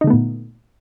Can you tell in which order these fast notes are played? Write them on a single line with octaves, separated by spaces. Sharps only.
D#4 D3 A3 B3 A#2